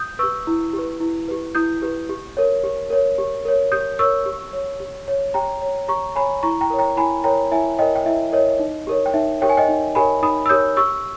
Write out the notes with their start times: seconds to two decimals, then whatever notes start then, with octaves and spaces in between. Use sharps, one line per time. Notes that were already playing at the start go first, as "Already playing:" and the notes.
Already playing: D#6 G6
0.19 G4 B4 C#6 E6
0.47 E4
0.73 G4
0.79 B4
1.00 E4
1.28 G4 B4
1.55 E4 D#6 G6
1.82 G4 B4
2.09 G4
2.37 A#4 C#5
2.64 G4
2.90 A#4 C#5
3.18 G4
3.45 A#4 C#5
3.72 G4 D#6 G6
3.99 A#4 C#5 C#6 E6
4.26 G4
4.53 C#5
4.80 G4
5.08 C#5
5.34 G4 G5 A#5
5.62 C#5
5.88 G4 A#5 C#6
6.16 C#5 G#5 B5
6.43 E4 A#5 C#6
6.61 G5 A#5
6.70 A#4 C#5
6.79 G5 A#5
6.97 E4 G#5 B5
7.24 A#4 C#5 G5 A#5
7.51 E4 E5 G#5
7.78 A#4 C#5 D#5 G5
7.95 G5
8.06 E4 E5
8.32 A#4 C#5 D#5
8.59 D#4
8.87 G4 A#4 C#5
9.06 G5
9.14 D#4 E5
9.41 G4 A#4 C#5 G5
9.49 G#5
9.57 D#5 G5
9.68 D#4
9.95 G4 A#4 C#5 G#5 B5
10.22 D#4 B5 D#6
10.46 E6
10.49 G4 A#4 C#5 D#6 G6
10.77 G4 C#6 E6